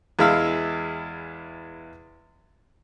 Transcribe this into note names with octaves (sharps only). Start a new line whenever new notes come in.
E2 G#3 E4 F5 E6